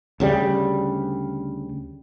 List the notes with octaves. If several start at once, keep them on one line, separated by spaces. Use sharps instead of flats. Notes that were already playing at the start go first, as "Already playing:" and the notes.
D2 C#3 F3 G3